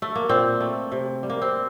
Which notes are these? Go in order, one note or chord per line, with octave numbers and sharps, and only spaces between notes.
A3
A#3
A#2 C4
A3
C3
G3
A#3
C4